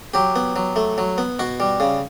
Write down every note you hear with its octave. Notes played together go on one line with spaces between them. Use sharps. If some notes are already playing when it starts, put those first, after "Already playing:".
F#3 G4
B3
F#3
A3
F#3
B3
B2 F#4
G3
C#3